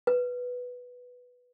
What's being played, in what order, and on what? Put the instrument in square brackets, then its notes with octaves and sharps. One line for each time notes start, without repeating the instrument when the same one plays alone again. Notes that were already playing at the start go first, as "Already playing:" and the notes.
[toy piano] B4